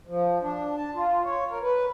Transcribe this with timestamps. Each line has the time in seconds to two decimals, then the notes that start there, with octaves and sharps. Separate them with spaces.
0.07 F3
0.40 D4
0.77 A5
0.95 F4
1.25 C#5
1.50 A#4
1.62 B4